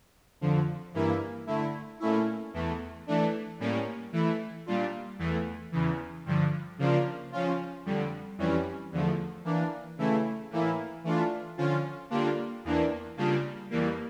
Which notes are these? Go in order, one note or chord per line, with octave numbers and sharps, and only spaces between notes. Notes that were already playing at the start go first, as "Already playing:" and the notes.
F2 D3 F3
G2 E3 A#3 E4
D3 A3 E4
A#2 A3 C#4 E4
E2 E3 A3
E3 A3 D4
A2 G3 A#3 C#4
E3 A3 E4
A#2 G3 D4 F4
E2 E3 A3
E2 C#3 E3
G2 D3 F3
C#3 F3 A#3 D4 F4
C#3 F3 C#4 F4
F2 D3 G3
F2 E3 G3 C#4
E2 D3 F3 A3
E3 A#3 D4
C#3 E3 A3 E4
A2 E3 A#3 E4
E3 A3 D4 F4
D3 F3 C#4 F4
D3 G3 A#3 D4 F4
E2 E3 A#3 D4
C#3 G3 A#3 D4 F4
F2 E3 G3 A#3